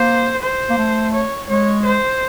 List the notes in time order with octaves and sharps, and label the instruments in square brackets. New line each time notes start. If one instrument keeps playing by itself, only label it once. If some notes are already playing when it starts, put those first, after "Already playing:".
Already playing: [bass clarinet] A#3 [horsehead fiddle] C5
[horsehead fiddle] C5
[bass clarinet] A#3
A3
[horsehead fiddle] C#5
[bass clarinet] G#3 [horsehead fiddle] C#5
[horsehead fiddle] C5